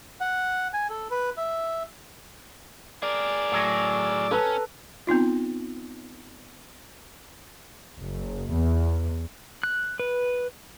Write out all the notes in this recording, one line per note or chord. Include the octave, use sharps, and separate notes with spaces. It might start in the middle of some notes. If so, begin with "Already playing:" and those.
F#5
G#5
A4
B4
E5
G#4 A#4 D5
A2 F#3
C#4 A4 B4 A#5
B3 C4 D#4 F4
F#1
E2
F#6
B4